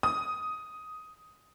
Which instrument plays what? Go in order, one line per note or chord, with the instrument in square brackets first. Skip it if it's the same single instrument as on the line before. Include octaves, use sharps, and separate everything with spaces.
[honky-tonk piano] D#6